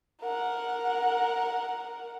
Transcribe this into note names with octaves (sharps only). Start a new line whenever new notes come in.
A#4 F#5